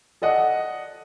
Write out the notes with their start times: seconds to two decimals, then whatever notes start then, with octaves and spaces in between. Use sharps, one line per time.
0.22 A4 D5 D#5 F#5